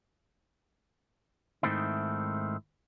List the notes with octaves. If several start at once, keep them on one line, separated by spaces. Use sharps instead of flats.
G#2 D#3 A3 C4 E4